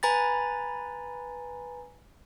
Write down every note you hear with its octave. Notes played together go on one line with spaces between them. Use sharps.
B4 G#5 A#5 B5 A6